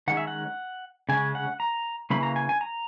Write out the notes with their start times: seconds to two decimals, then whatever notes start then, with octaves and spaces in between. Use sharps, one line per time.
0.08 D#3 G#3 C#4 F#5
0.17 E5
0.27 F#5
1.09 C#3 G#3 C#4 G#5
1.35 F#5
1.60 A#5
2.10 C#3 E3 A#3 C#4 B5
2.23 A#5
2.36 G#5
2.49 G#5
2.61 A#5